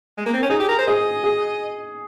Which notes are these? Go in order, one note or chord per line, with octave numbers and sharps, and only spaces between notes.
G#3
A#3
C4
C#4
D#4 G#4
G4
A#4
C5
G#4 D#5
G#4